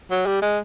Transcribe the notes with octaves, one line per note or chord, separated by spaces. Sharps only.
F#3
G3
G#3